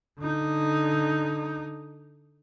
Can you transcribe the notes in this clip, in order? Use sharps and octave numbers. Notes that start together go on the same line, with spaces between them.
D3 D#4